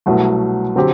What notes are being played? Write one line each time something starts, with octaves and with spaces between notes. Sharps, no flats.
C2 B2 F#3 A3
D3 F#3 C4 G4